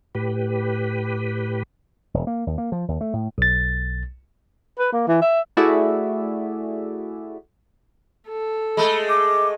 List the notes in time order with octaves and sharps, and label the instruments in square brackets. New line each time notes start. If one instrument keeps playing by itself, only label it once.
[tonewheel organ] A2 G4 B4
[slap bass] E1
A#3
D#2
A#3
F3
D#2
A3
A2
[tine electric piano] B1 A6
[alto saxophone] B4
A#3
E3
E5
[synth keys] A3 E4 F#4 G#4 D5 E5
[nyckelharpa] A4
[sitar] G#3 A3 [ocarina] B5
[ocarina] D6